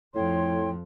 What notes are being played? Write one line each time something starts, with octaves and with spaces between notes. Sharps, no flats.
F2 A2 F3 C#5 G5 C6